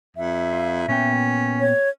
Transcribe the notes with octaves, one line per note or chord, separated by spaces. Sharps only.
F2 E5
F4
A#2 B3 C#4 G5
C#5